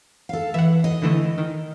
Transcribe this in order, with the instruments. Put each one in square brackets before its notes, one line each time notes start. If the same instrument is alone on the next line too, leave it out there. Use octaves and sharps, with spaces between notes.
[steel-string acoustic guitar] A4 F5
[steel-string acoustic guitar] E3 [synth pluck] E5 F#5
[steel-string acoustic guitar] D#5
[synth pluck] D3 E3 A3
D#3